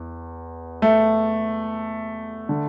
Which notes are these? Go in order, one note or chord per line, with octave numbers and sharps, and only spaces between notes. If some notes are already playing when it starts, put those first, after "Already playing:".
Already playing: E2
A3
D3